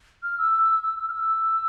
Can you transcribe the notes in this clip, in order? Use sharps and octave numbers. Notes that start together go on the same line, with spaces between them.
F6
E6
E6
E6
F6
E6